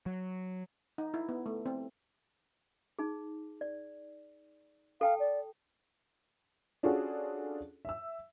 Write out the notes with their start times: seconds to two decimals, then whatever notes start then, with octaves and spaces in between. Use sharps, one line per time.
0.06 F#3
0.98 D#4
1.14 E4
1.29 B3
1.46 A3
1.66 C4
2.99 D#4 G#4
3.61 D5
5.01 A4 F5 G5 A5
5.20 D5
6.83 C#4 D4 F4 F#4 G#4 A4
7.85 E5 E6